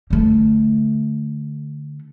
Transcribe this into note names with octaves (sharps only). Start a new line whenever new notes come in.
D3 A3